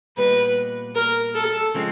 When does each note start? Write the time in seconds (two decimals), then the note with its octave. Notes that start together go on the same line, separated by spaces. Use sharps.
0.17 A#2 G3 B3 D#4 B4
0.95 A#4
1.35 A4
1.74 C#3 F3 G#3 C4